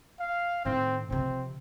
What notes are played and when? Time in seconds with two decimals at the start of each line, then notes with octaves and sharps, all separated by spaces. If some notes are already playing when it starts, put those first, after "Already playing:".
0.20 F5
0.65 A2 D#3 C4
1.10 C3 F3 C4